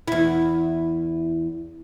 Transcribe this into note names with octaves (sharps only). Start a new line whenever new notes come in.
E2 E4